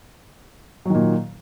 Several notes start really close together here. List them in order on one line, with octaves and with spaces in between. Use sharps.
F#3 D#3 A#2